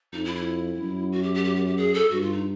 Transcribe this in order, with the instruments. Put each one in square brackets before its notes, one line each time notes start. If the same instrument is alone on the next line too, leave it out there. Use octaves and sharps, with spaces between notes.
[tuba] F2 [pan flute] D#4
[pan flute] E4
E4
[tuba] F#2
[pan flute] F#4
G4
G4
G4
G4
G4
G#4
A4
[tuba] G2 [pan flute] F#4
[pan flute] F4
D#4